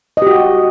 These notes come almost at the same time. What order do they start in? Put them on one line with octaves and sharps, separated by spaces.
D#5 G4 F#4